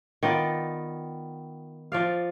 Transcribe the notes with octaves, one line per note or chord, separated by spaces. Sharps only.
D#3 B3 F4 D5
F3 D5 F5